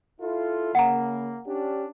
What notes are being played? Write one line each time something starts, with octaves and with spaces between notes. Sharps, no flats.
E4 F4 A4
C#3 A#3 F#5 A#5
C#4 D4 G4